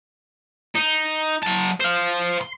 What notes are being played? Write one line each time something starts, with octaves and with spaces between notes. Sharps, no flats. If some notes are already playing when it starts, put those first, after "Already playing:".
D#4
F#3 A5
C5 F5
C6